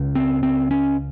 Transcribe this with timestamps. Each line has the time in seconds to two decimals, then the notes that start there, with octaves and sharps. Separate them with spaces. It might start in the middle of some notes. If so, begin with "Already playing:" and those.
Already playing: C#2 C#3
0.15 C4
0.43 C4
0.71 C#4